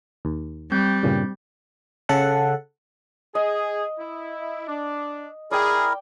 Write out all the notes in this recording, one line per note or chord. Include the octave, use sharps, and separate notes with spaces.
D#2
G3 C4 G6
G2 A#2 C#3
C#3 A4 F#5
G#4 D#5
E4
D4
E4 G#4 A#4 D5 G5